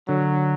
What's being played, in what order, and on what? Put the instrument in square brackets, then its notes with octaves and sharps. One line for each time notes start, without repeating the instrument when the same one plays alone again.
[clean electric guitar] D3 [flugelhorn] F#3